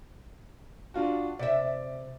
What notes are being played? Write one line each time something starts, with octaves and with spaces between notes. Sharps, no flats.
D4 F4 F#4
C3 D5 E5